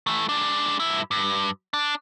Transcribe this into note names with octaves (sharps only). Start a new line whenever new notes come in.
E3 A3
G#3 D4
G2 E4
G2
D4